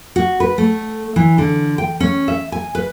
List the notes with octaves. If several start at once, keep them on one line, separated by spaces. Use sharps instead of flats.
F#4
B4
A3
E3
D3
G5
C#4
E5
G#5
B4